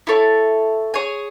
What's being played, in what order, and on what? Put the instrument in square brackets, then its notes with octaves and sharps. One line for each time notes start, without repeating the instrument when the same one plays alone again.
[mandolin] E4 A4 C#5
G#4 C#5 G#5